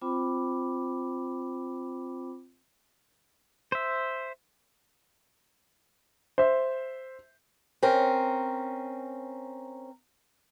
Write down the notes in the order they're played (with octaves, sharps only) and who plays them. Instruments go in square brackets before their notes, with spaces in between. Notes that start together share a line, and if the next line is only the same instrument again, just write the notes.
[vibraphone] C4 F4 C5 G5 B5 D6
[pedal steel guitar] C5 E5
[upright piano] C5 E5
[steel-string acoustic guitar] C4 C#4 A#4